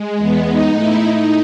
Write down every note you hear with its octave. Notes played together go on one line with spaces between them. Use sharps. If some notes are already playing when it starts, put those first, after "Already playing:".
Already playing: G#3
E2 E3 B3
D#4
A2 A3 E4
D#4